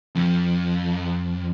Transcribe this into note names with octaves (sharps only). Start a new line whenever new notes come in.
F2